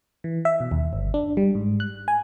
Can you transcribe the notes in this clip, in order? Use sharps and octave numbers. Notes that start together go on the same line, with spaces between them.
E3
E5
B2
D#2
G1
D4
G3
G#2
F#6
G#5